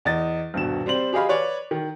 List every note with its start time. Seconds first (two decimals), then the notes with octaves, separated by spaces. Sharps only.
0.05 E2 D#5 A6
0.54 D#1 G2 B2 E7
0.86 G3 C4 C5 F#7
1.13 G4 G#4 D#5 F5 B5
1.29 B4 C#5 D5
1.71 D#3